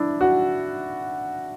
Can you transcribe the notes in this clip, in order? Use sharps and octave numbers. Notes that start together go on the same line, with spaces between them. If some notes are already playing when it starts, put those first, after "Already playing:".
Already playing: D4 E4
F#4